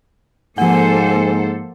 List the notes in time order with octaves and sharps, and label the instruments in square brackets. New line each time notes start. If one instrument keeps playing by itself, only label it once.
[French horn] G#2 [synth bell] F3 F#5 [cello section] A#3 A4 C5 [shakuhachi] G#5